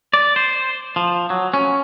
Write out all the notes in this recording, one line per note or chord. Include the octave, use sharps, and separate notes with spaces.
D5
C5
F3
F#3
C#4